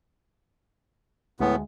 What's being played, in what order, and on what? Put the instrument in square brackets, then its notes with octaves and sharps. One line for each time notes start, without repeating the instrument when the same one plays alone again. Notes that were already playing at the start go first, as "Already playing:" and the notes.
[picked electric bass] D2 G#3 [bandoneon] A2 B3